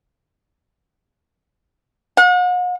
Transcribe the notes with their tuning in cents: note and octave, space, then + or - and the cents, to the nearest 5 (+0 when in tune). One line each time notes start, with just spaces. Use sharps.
F#5 -45